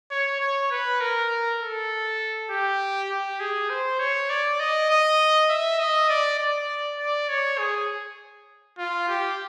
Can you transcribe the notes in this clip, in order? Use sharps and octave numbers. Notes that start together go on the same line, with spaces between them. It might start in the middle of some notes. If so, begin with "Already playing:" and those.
C#5
C#5
B4
A#4
A4
G4
G4
G#4
C5
C#5
D5
D#5
D#5
E5
D#5
D5
D5
D5
C#5
G#4
F4
G4